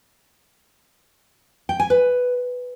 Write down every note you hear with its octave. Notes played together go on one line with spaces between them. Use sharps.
G5
G#5
B4